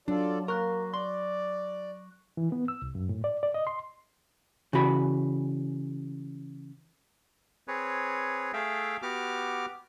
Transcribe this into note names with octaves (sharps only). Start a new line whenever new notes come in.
F#3 D4 F4 A4 D5
A#3 A#4 C#6 F#6 A#6
D5 C6
E3
B3
E6
C2
F#2
A2
D5
D5
D#5
C6
C#3 E3 F#4 B5
C4 G#4 B4 C#5
A3 G#4 E5 F5 G5
B3 F#4 G4 D6 F6